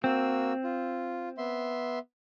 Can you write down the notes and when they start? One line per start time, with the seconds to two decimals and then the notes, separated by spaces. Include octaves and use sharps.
0.04 A#3 C4 F#4 E6
0.64 F4
1.38 B3 E5 C6